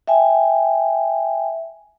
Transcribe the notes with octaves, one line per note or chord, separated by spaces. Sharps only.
E5 G5 G#5